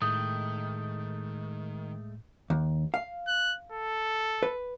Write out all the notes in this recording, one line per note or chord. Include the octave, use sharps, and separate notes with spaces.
A2 D#3 G#3 A3 D#6 G6
D#2
F5
F#6
A4
B4